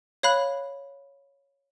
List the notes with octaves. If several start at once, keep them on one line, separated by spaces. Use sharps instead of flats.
C#5 F5 B5 F#6